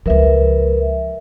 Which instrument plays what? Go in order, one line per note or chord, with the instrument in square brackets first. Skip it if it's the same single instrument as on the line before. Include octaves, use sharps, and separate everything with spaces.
[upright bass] C#2 F3 [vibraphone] A#4 B4 E5